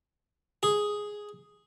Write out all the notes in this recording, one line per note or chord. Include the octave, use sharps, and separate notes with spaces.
G#4